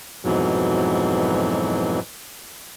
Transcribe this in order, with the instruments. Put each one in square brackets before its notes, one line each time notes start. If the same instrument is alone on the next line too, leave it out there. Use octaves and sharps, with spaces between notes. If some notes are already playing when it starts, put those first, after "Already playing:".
[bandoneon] F2 G#2 B2 E3 F#3